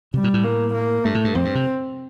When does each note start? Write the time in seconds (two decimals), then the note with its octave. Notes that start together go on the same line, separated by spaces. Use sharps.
0.14 C3 G3
0.24 A#2
0.34 A2
0.44 A#3
0.74 A#3
1.04 G2 A3
1.15 A2
1.24 G2
1.35 F2 C4
1.45 G2
1.55 C3